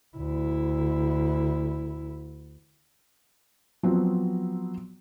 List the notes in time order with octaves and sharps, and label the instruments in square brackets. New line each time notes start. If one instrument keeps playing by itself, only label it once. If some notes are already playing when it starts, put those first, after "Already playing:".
[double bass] D2 E4
[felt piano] F3 F#3 B3 C4